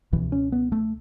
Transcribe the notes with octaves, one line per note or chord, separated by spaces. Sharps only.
C#2 B2 E3
C#4
B3
A3